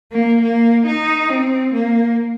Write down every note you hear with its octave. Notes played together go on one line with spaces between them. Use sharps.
A#3
A#3
D#4
C4
A#3